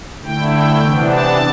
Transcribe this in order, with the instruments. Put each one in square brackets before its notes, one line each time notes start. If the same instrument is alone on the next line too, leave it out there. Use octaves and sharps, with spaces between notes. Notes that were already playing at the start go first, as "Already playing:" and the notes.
[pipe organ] D3 A3 E4 G5
G5
C3 E3 B3 D4
A5